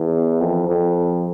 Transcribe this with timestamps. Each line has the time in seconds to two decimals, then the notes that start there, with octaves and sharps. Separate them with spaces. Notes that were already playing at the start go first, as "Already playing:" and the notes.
Already playing: E2
0.41 F2
0.69 F2